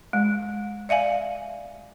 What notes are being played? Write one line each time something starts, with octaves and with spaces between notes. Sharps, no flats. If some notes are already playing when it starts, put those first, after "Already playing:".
G#3
D5 E5 F5 G#5